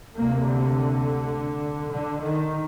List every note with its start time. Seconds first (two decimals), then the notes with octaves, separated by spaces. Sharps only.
0.17 D2 C3 A#3
0.46 D3
1.92 D3
2.22 D#3